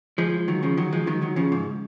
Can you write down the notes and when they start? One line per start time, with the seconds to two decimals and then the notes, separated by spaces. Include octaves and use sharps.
0.18 F3 G#3
0.48 D#3 F#3
0.63 C#3 F3
0.77 D#3 F#3
0.93 F3 G#3
1.07 D#3 F#3
1.22 D#3 F#3
1.36 C#3 F3
1.52 G#2